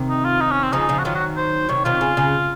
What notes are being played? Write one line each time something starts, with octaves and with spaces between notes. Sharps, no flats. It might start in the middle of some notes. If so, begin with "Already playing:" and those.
Already playing: C3 D#3
D#4
F4
D#4
C#4
C4
C#3 F3 D#4
C#3 F3
F#4
D#3 F#3 F4
F#4
C5
C3 D#3 C#5
C3 D#3 F4
C#3
C#3